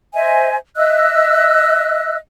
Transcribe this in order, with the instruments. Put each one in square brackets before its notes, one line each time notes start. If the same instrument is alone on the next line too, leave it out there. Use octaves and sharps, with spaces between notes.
[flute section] C5 D#5 E5 G#5
D#5 E5 E6 F#6